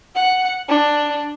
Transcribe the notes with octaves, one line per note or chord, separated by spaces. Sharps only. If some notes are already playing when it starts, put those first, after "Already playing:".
F#5
D4